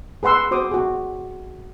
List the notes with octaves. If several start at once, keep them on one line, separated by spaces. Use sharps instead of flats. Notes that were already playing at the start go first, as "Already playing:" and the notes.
G#4 B4 F#5 C6 E6
F#4 C5 D6 D#6
F#4 G#4